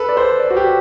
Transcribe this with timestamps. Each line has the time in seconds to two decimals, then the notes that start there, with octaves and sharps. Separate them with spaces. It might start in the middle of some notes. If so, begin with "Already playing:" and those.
Already playing: A4 B4
0.09 D5
0.17 C5
0.40 D5
0.50 F#4
0.57 G4